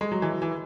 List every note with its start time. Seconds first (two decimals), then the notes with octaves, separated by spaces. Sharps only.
0.01 G#3
0.12 F#3
0.22 E3
0.42 E3